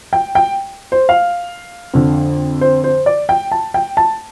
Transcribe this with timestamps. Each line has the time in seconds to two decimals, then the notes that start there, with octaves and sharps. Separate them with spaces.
0.13 G5
0.35 G5
0.92 C5
1.09 F5
1.94 F2 D3
2.61 C5
2.84 C5
3.06 D5
3.29 G5
3.52 A5
3.74 G5
3.97 A5